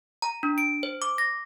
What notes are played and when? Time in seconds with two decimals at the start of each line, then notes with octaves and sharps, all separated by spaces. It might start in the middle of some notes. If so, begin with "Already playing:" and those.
0.22 A#5
0.43 D4
0.58 D7
0.83 C5
1.02 D6
1.18 A#6